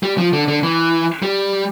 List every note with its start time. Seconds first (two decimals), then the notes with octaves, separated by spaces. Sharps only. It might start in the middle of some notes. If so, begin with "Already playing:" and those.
0.03 G3
0.18 F3
0.33 D3
0.48 D3
0.63 E3
1.22 G3